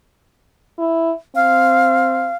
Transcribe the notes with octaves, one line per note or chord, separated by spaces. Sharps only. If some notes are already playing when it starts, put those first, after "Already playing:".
E4
C4 F5